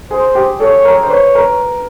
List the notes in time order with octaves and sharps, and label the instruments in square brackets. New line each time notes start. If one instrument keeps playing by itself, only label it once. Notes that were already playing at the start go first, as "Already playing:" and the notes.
[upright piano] G#4 [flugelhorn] C5
[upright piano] G4
[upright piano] A4 [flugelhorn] C#5
[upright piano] A#4
C5
[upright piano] B4 [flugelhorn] C#5
[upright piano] A#4